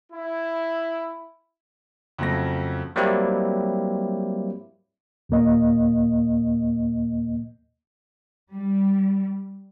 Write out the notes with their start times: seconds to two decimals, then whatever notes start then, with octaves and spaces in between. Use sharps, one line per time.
0.12 E4
2.18 F2 C#3 F#3 A3 C4 A#6
2.96 F#3 G3 A#3 C4 E4 G4
5.29 D#2 A#2 A#3 D#5
8.53 G3